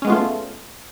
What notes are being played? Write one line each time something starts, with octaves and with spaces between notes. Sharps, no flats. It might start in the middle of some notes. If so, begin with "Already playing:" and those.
G#3 A3 B3 C#4 F4